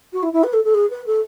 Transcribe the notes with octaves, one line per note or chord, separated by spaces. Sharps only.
F#4
E4
E4
B4
A4
A4
G#4
B4
A4